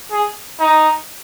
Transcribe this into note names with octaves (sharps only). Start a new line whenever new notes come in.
G#4
D#4